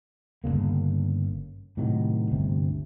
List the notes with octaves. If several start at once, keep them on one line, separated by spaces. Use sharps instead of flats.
G1 F#2 C#3 A#3
A2 C3 D#3 F#3
G1 D2 C3